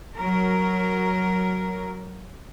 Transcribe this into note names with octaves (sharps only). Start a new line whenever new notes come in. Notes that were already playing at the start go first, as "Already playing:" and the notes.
F#3 A#4